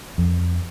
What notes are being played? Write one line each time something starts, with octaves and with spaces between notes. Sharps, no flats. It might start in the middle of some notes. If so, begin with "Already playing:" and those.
F2